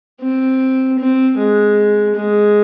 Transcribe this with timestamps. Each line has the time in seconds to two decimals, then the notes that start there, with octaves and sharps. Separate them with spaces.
0.21 C4
0.99 C4
1.38 G#3
2.15 G#3